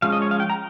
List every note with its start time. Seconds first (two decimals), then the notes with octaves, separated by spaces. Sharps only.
0.02 F3 G#3 C#4 F5
0.12 D#5
0.22 C#5
0.31 F5
0.40 G5
0.50 A#5